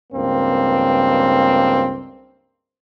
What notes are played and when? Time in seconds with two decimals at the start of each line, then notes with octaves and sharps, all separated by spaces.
0.13 C#2 G2 A#3 C4